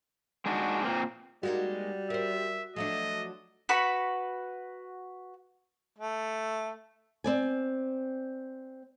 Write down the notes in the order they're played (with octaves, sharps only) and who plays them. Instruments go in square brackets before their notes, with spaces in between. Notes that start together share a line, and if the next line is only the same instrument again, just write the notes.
[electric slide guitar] G#3 D4 D#4 F#4
A#2 A#3 C4
[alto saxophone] G3 [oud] G#3 A#3 D#4 [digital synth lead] F#4
[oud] A#4 C5 [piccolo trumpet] E5
[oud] F3 F#3 D4 [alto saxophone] A3 [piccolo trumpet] D#5
[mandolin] F#4 B4 B5 C#6
[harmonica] A3
[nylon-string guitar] C4 D5 G#5